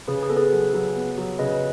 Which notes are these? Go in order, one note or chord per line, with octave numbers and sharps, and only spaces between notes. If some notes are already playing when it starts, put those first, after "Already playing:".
C#3 G#4 B4
G#4
B3 A4
G#4 B4
F#3
F#3
B3
F#3
C#3 B4 D#5